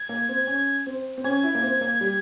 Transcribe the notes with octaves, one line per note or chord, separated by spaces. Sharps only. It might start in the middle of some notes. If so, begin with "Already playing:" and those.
Already playing: G#6
A#3
C4
C#4
C4
C4
C#4 G#6
E4
A#3
C4
A#3
G3